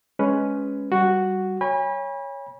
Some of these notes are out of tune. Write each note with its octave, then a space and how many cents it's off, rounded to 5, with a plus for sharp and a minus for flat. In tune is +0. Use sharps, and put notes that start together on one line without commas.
G#3 +10 C#4 +5 B4 +10
G3 -20 F#4 +0
C#5 +0 G#5 -40 B5 -30